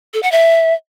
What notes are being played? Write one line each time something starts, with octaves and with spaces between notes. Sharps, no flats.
A4
F#5
E5